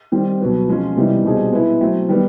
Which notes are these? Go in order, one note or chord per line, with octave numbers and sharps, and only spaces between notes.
D#3 G3 C4
B2 F#3 B3
F3 G#3 C#4 F4
C3 E3 G3 B3 D#4
B2 G3 C4 D#4 G#4
G#3 B3 E4
F#3 A3 C4
D#3 G3 B3